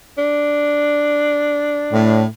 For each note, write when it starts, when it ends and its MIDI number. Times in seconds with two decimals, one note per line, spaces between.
0.18 2.21 62
1.92 2.25 45